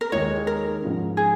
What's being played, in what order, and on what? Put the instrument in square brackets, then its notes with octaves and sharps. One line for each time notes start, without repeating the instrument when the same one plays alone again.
[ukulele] A#4
[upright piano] D#2 D#3 G#3 [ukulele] C#5
[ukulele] A#4
[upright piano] G#2 F3 C#4
[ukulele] G#4